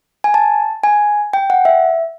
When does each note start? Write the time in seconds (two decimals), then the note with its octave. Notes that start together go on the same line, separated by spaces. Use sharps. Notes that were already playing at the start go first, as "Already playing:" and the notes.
0.24 G#5
0.34 A5
0.83 G#5
1.33 G5
1.50 F#5
1.65 E5